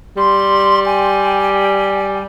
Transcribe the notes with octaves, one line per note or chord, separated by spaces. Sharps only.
G3 C6
G5 G#5